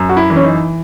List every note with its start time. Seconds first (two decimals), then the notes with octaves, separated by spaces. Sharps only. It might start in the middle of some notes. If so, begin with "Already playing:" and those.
Already playing: F#2
0.09 F#4
0.17 E4
0.30 E3
0.36 C#4
0.43 D#4